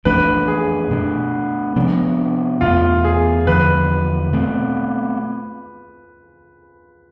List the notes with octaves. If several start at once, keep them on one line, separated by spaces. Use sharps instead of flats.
F2 E3 A3 D4 B4
G#4
B2 A3 D4
C3 F3 B3 D4
E2 B2 A3 F4
G#4
E2 D3 F3 B4
B2 A3 C4